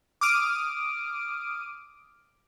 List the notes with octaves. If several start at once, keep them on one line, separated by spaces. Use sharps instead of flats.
D6 D#6 F6 D7 D#7